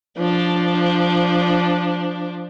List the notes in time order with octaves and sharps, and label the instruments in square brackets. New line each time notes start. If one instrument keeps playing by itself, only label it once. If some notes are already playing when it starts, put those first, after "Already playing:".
[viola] F3 D4